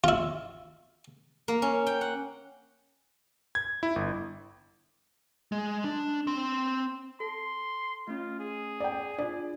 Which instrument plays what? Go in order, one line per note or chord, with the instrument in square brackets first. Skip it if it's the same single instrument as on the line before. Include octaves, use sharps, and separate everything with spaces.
[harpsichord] E4 F4
[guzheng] A#3
C#4
G5
F#5
[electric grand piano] G#6
E4
G1
[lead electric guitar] G#3
D4
C4 C6
[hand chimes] A4 [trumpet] C6
[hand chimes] A3 C#4 [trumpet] F4
[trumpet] G#4
[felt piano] D5 G5
[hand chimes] D4 F4 [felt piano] D5